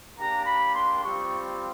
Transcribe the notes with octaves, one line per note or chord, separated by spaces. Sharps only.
A#3 D4 G4 A#5
B5
C6
G3 C4 F4 C#6